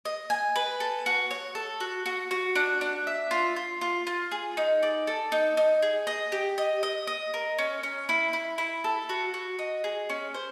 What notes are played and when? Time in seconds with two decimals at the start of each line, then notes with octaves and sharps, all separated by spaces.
0.05 D#5
0.30 G#5
0.56 B4
0.80 A4
1.06 F#4
1.31 C#5
1.55 A4
1.80 F#4
2.06 F#4
2.31 F#4
2.55 D4
2.81 D4
3.07 E5
3.31 F4
3.56 F4
3.81 F4
4.07 F4
4.31 G#4
4.57 D#4
4.83 D5
5.07 A4
5.32 D#4
5.57 D#4
5.82 G#4
6.07 D#5
6.32 G4
6.58 D#5
6.83 D#5
7.07 D#5
7.34 A#4
7.59 C#4
7.83 C#4
8.09 E4
8.33 E4
8.58 E4
8.84 A4
9.09 F#4
9.34 F#4
9.59 D#5
9.84 G#4
10.10 C#4
10.34 C5